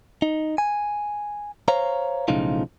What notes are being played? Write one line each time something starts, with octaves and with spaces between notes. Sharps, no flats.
D#4
G#5
C5 C#5 F5 A#5
B1 A2 C#3 F3 D#4 F4